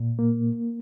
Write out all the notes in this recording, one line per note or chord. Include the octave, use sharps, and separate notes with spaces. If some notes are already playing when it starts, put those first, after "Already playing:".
Already playing: A#2
A#3